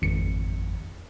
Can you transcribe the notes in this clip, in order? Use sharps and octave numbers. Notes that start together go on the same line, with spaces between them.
G#1 F2 C#7